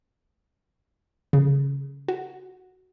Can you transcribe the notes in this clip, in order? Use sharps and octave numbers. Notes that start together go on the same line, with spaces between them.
C#3
F#4